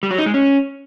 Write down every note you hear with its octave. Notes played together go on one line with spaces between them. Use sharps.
G3
F#3
D#4
G#3
C#4